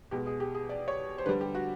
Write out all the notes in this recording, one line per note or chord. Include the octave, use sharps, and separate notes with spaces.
B2 G#3 G4
G#4
G4
G#4
D5
C#5
C5
D3 G3 B4
G4
F#4